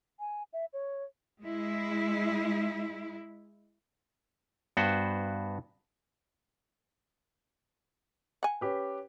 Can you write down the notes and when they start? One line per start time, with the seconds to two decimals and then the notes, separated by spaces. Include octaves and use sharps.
0.20 G#5
0.53 E5
0.73 C#5
1.43 G#3 E4
4.77 G2 B3 F#4 C5
8.43 F#5 G#5
8.61 C#4 G4 B4